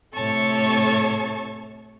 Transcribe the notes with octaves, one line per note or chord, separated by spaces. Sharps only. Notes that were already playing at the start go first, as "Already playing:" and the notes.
A2 C3 A4 C#5 A5 C#6